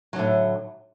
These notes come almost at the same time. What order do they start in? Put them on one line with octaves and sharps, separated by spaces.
F#3 D3 A2